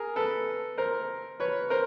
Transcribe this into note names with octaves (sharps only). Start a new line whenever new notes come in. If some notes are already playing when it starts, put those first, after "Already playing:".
Already playing: G#4 A#4
A4 B4
A#4 C5
B4 C#5
A#4 C5